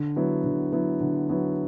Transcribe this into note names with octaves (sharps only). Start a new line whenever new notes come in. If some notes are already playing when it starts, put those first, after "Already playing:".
Already playing: D3
F#3 B3 E4
D3
F#3 B3 E4
D3
F#3 B3 E4